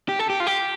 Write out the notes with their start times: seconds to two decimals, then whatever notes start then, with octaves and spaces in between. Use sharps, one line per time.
0.09 G4
0.19 A4
0.30 G4
0.40 F4
0.47 G4